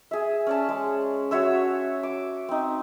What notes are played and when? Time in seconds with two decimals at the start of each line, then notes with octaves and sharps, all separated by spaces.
0.11 G#4 E5
0.47 C#4 D5 A5
0.69 G#3
1.31 F#4 C#5 E5 E6
2.03 D6
2.49 C4 D#4